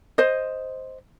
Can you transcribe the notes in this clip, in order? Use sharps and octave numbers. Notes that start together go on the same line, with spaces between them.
C5 D#5